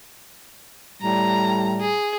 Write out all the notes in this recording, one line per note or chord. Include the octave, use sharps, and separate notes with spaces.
A2 G3 A#5
G#4